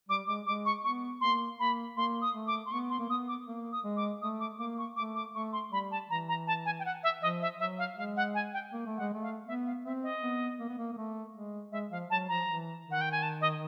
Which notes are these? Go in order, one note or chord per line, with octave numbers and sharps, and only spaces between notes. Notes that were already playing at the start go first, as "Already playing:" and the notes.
G3 D6
G#3 D6
G#3 D6
C#6
B3 C#6
A#3 C6
A#3 B5
A#3 C6
D#6
A3
D6
C6
B3 C#6
C6
A#3
B3 D#6
D6
A#3
D#6
G#3
D6
A3 D#6
D6
A#3 D6
C#6
A3 D6
D6
A3 C#6
C6
G3 B5
A5
E3 A#5
A#5
A5
G#5
G5
F#5
E5
F3 D#5
E5
F#3 E5
F5
G#3 F5
F#5
G#5
G5
A#3
A3
F#5
G#3
A3
F5
B3 E5
F5
C4 E5
D#5
B3
A#3
B3
A#3
A#3
A3
G#3
G#3 E5
F3 F5
F#3 A5
F3 A#5
E3
D#3
F#5
G5
G#5
A5
D#5